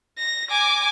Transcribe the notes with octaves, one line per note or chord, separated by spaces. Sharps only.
A#6
G#5 D6